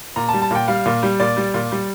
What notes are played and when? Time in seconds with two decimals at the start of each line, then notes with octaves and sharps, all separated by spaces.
0.16 A#2 A#5
0.29 A5
0.33 G3
0.42 A5
0.51 A#2 G5
0.68 G3 F5
0.86 A#2
1.03 G3
1.20 A#2 D5
1.37 G3
1.54 A#2
1.72 G3